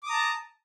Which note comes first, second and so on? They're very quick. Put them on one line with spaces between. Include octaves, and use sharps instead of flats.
D6 D#6 A#5 A5